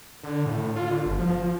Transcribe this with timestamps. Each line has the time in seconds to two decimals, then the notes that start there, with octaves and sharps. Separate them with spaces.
0.24 D3
0.46 A2
0.76 F4
0.91 D3
1.06 G1
1.19 F3